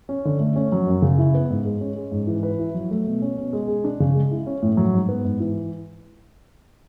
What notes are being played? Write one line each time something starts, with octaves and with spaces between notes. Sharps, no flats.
C#4
D3
A3
C#4
F#3
F#2
C#3
E4
B3
G#2
G#3
C#4
G#3
G#2
E3
B4
E4
F#3
A3
B2
C#4
B2
G#3
G#4
D4
C#3
G#3
E4
C#4
A2
F#3
G#2
B3
G#2
E3